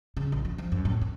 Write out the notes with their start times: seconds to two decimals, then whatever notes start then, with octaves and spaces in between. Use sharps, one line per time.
0.17 C#3
0.32 A#1
0.45 F3
0.58 F3
0.72 F#2
0.85 A2
1.01 F#2